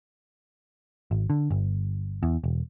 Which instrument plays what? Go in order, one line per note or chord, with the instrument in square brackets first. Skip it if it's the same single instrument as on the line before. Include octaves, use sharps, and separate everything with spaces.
[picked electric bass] G#1
D3
G1
E2
E1